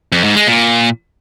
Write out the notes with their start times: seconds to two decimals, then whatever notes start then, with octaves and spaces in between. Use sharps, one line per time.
0.12 F2
0.24 G#2
0.36 G#3
0.47 A#2